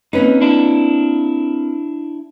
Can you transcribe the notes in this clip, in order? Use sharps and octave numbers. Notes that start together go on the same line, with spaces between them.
A#3 C4 C#4 D#4 B4
D4 E4